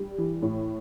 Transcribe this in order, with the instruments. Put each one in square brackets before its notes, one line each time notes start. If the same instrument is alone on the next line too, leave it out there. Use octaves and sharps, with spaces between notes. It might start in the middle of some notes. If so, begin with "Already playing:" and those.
Already playing: [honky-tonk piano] G3
E3
A2